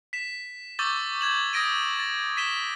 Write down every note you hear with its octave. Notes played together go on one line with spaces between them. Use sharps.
B6 E7
C#6 D6 E6 G6 A6 G7
G6 G#6 E7 F#7
D#6 G#6 A#6 D7 D#7
A6
B6 D#7 E7 G7